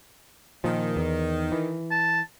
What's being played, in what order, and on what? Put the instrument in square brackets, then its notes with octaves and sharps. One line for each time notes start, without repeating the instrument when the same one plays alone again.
[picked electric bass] A#2 F3 [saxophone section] D#3
[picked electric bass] E2
E3
[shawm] A5